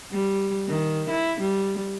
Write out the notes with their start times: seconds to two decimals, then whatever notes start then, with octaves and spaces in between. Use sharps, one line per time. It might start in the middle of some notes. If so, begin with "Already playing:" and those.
0.12 G3
0.68 D#3
1.10 E4
1.40 G3